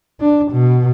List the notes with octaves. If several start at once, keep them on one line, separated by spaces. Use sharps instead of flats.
D4
B2